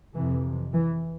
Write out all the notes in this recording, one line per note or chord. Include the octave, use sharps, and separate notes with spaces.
F2 C3 E3
E3